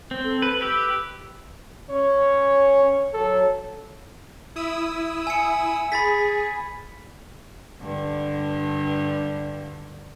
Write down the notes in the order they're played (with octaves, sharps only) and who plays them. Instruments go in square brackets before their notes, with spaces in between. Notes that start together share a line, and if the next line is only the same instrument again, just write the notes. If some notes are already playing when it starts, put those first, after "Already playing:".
[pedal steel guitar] C4
[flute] A4
[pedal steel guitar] B4
[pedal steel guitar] G4 B4 [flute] E6
[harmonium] C#4 [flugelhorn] C#5
[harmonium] F#3 [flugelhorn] A4
[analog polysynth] E4 D#6 E6
[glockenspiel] G#5 C#7
[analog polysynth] G#4 [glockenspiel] B5 A6 B6
[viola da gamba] G2 D3